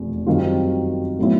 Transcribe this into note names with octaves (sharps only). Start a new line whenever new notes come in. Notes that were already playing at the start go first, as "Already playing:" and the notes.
Already playing: F1 E2 B2
F#2 D#3 G3 C4 F4
A2 F#3 B3 E4